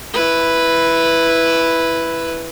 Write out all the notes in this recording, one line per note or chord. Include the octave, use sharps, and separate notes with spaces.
E4 B4